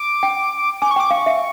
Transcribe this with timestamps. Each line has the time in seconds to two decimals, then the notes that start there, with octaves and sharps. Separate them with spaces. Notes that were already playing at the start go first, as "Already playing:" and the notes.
Already playing: D6
0.23 G5
0.82 G#5 D6
0.91 C#6
0.96 G5 D6
1.11 F5 C#6
1.26 E5